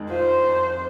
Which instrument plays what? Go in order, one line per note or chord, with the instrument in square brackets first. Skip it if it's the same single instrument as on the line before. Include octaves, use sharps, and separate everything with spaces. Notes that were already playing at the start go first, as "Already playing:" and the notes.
Already playing: [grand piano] F2 D#3 G#3
[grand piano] F4 [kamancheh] C5
[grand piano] F2